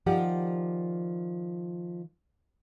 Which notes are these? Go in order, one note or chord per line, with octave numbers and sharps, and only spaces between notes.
D#3 F3 G4 D5 F#5